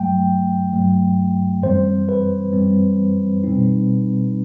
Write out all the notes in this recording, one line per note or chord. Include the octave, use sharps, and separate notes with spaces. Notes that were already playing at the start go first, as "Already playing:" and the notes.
Already playing: G2 F#3 A3 G5
G2 F#3 A3
F#2 E3 G3 C4 C5
B4
F#2 E3 G3 C4
B2 G3 C4 D#4